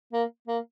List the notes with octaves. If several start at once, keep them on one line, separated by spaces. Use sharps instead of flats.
A#3
A#3